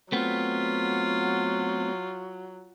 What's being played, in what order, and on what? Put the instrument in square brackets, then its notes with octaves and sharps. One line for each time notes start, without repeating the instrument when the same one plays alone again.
[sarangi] F#3 [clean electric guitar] A3 B3 C4 [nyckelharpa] F4